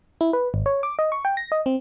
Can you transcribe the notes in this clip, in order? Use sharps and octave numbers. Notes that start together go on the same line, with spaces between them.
E4
B4
G#1
C#5
D6
D#5
C#6
G5
A#6
D#5
C4